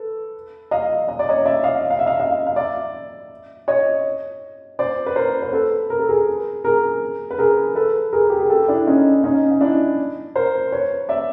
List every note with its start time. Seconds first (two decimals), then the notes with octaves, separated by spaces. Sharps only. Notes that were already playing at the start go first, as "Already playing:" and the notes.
Already playing: A4 B4
0.71 D#5 F5
1.09 D#5
1.19 D5
1.29 C#5 D#5
1.46 D5 E5
1.64 D#5 F5
1.90 F5
1.99 E5
2.06 D#5 F5
2.20 D#5 F5
2.47 F5
2.56 D5 E5
3.68 C#5 D#5
4.79 C5 D5
5.06 B4
5.16 A#4 C5
5.42 C5
5.53 A4 B4
5.90 A#4
5.99 A4
6.09 G#4 A#4
6.64 G#4 A#4
7.31 B4
7.39 G#4 A#4
7.75 A4 B4
8.13 G#4 A#4
8.30 G4
8.39 G#4
8.50 G4 A4
8.68 D4 E4
8.87 C#4 D#4
9.24 C#4 D#4
9.51 D#4
9.61 D4 E4
10.35 A#4 C5
10.72 B4 C#5
11.09 D5 E5